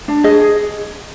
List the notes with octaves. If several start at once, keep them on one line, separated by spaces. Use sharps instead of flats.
D4
G#4 D#5
G#4